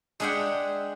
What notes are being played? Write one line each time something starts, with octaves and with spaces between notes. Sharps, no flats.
G#3 D4 G#4 E5 F#5 G5